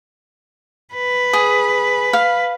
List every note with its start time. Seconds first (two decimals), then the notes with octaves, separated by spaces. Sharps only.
0.94 B4
1.33 G#4
2.13 F5